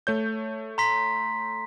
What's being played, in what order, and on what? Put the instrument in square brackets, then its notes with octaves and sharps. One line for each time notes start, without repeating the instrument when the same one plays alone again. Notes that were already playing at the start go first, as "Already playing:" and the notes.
[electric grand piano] A3 C#5 G6
[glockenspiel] A#5 C6 B6